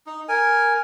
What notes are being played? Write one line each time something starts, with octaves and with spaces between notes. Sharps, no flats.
D#4
A#4 G#5